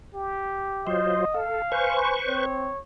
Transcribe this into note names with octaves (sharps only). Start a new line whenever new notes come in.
G4
F#3 F4 C5 D#5
A4 F5
B4 C5 G#5 C#6
C4 C#5